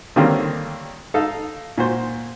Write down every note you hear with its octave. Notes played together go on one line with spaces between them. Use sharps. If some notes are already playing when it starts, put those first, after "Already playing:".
D3 D#3 G3 A#3 C4 C#4
D#4 A4 F5
A#2 F#4 C5